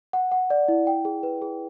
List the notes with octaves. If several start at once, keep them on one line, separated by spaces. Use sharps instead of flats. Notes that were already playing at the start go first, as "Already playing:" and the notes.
F#5
F#5
D5
E4
G5
G#4
B4
G#4